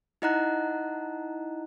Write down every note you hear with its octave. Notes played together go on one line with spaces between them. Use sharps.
D#4 E4 D#5 F#5 A#5 F#6